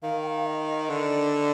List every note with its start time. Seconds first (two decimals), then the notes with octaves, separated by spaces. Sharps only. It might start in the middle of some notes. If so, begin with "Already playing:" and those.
0.03 D#3 F5
0.22 G5
0.27 F5
0.47 D#5
0.89 D3 D5